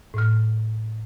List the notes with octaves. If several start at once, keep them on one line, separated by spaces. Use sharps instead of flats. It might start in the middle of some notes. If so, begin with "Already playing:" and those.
A2 F6